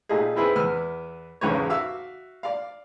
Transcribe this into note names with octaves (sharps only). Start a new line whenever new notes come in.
A#2 A3 D#4 F4 G4 G#4
B3 C4 E4 G#4 B4
E2 B3 B4 E6 F6
B1 E2 G#2 C#3 B4 C#5
F#4 E5 F5 D6 E6
D5 F5